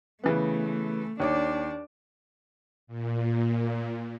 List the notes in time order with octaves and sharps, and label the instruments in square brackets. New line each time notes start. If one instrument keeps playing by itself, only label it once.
[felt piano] C#3 E3 B3 [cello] A3
[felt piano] D#2 C#5 D6 [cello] D4
[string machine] A#2